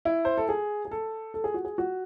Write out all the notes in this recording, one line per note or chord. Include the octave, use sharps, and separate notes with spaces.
E4
C5
A4
G#4
G#4
A4
A4
G#4
F#4
G#4
F#4